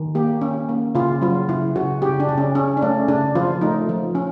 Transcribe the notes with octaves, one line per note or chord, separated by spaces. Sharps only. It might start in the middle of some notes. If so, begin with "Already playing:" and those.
Already playing: D#3
A#3 G4
C#4
A#3
C#3 F4
F#3 F4
C#3 E4
C#3 F#4
C#3 G4
D4
C#3
C#4
C#4
D4
A3 C#4
C#3 D4
F3 F4
A3 D#4
F3
C#4